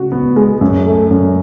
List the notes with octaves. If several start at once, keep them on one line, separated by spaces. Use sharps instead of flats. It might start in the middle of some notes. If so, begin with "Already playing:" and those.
Already playing: C#3 F#4
B3
G#3
F#2
A3
F#2